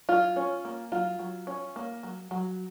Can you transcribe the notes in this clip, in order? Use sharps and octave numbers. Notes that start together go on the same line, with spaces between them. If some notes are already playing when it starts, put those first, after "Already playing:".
F#3 F4
C#4
A#3
F#3 F4
F#3
C#4
A#3
F#3
F#3